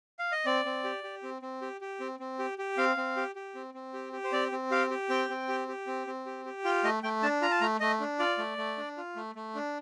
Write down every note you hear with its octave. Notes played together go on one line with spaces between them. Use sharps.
F5
D#5
C4 D5
C4
G4
G4
C4
C4
G4
G4
C4
C4
G4
G4
C4 F5
C4
G4
G4
C4
C4
G4
G4
C5
C4 D5
C4
G4 F5
G4
C4 G5
C4
G4
G4
C4
C4
G4
G4
F4 G5
A3 D#5
A3 G5
D4 A5
F4 A#5
A5
A3 A#5
A3 D#5
D4
F4 D5
A3
A3
D4
F4
A3
A3
D4